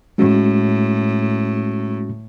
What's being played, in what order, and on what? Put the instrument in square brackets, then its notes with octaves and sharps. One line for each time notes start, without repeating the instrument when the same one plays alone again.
[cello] A2 [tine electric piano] G#3 C#4 F#4